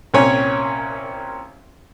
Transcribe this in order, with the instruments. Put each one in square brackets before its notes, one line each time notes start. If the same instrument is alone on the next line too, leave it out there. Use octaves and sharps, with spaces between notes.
[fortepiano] C2 A#2 C4 C#4 C#5 G#5